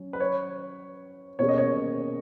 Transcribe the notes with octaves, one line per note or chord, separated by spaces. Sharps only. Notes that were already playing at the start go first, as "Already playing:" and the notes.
Already playing: F#3 C#4
B4
C#5
B2 A#3 C#4 G#4 C#5
D#5
C#5